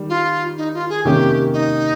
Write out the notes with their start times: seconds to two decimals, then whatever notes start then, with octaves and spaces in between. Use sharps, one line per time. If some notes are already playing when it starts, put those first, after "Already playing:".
Already playing: D#3 G3
0.09 F4
0.58 D#4
0.74 F4
0.90 G#4
1.05 C3 D#3 A#3 C#4 G4
1.53 D#4